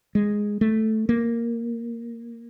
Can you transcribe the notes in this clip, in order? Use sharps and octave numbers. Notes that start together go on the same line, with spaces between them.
G#3
A3
A#3